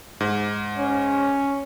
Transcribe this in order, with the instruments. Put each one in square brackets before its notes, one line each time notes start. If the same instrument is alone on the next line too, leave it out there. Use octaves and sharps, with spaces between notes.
[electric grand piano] G#2
[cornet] C#4